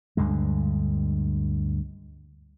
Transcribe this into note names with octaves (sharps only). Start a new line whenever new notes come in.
D2 G2 D3 G#3